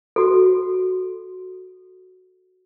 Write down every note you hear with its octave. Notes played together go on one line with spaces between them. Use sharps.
F#4 A4